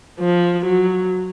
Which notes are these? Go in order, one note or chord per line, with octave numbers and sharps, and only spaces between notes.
F3
F#3